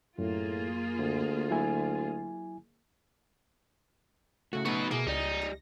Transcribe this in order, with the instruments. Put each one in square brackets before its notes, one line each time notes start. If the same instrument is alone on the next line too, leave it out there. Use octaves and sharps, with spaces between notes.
[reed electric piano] F#2 [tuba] A2 [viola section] A#3 F4 G#4
[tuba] D2
[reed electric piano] F#3 E4 G#5
[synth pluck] A2 C#3 A3 [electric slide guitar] F#4
[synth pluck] A3 B5 D#7 [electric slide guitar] B3 D#4 [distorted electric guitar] F#4 B4
[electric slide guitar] B2 [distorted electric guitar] A#3 [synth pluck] E4 G#4
[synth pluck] C#2 [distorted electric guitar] D#4 [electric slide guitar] G4 D5 D#5
[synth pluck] A#6